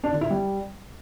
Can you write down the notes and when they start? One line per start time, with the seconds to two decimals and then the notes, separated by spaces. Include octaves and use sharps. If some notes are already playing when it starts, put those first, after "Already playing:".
0.04 D4
0.12 D3
0.21 E4
0.30 G3